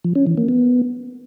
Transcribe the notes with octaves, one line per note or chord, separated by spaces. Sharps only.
F3
C#4
E3
A#3
B3